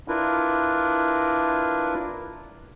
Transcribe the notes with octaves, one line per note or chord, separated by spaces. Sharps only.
D4 E4 F4 A#4 B4